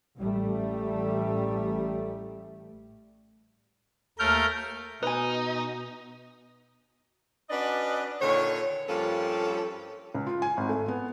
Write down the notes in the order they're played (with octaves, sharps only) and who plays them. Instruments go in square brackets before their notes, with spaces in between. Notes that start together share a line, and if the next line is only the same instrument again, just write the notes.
[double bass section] A1 G3 A3
[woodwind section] D#2 F6 [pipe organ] A3 A#4 G6
[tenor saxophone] B2 [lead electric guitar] D#4 [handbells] B4 G#5
[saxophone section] C#4 D4 F#4 B4 D5 D#5
A#2 D3 D#3 C#5
G2 F3 A#3 C#4 A4
[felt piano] C#2
F4
G#5
G#1
A3
B3